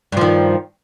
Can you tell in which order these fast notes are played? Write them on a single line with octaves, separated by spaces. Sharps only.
G2 F3 D#3